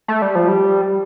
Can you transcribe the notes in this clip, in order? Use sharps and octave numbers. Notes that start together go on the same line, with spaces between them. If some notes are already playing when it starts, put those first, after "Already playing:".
A3
G3
F3
G3